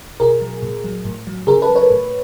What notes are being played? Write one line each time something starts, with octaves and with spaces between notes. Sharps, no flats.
B2 G#4 A#4
F#3
A#2
F#3
A2
F#3
C#3 G#4 A#4
A4 B4
F#3
B4 C#5
A2